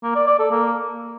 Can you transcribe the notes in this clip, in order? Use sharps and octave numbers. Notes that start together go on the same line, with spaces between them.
A#3
D5
D5
A4
A#3